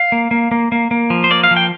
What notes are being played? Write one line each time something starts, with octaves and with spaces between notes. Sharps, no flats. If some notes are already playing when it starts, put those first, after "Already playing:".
Already playing: F5
A#3
A#3
A#3
A#3
A#3
F3
C5
A#3 D5
F5
F3
G5